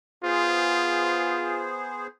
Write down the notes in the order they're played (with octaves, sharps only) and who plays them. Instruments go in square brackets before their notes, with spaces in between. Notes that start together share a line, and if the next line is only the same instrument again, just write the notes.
[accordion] B3 G#4 C5 [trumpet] F4